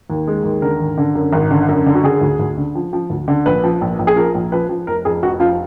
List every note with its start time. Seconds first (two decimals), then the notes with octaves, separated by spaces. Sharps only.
0.10 D#2
0.27 G#3
0.44 D#2
0.62 D3 A#4
0.80 G#1
0.98 D3
1.15 F#2
1.33 G#1
1.51 D3
1.69 F#2
1.86 D3
1.95 F#4
2.04 D3 G#4
2.21 D2
2.39 D2
2.57 D3
2.75 F3
2.93 F3
3.10 D2
3.28 D3
3.46 A#1 B4
3.64 F3
3.81 A#1
3.99 A#1
4.07 G#4
4.16 F3 A#4
4.35 A#1
4.52 F3 B4
4.69 F3
4.87 F1 A#4
5.05 F2 G#4
5.22 F1 F#4
5.40 F3 F4